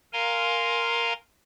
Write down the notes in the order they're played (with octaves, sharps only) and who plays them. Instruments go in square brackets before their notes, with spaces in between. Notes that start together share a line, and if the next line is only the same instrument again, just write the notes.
[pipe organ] A#4 F5 G#5 A#5 C6